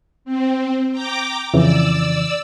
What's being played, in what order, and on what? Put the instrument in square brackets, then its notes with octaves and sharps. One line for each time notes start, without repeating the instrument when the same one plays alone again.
[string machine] C4
G5 A#5 D6
[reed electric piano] F2 C#3 E3 [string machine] D5 E6